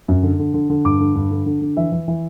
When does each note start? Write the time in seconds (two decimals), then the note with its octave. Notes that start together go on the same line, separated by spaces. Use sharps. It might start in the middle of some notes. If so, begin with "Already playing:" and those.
0.08 F#2
0.23 D3
0.39 D3
0.54 D3
0.70 D3
0.85 G2 D6
1.00 D3
1.15 G2
1.31 D3
1.46 D3
1.62 D3
1.77 E3 E5
1.92 E3
2.08 E3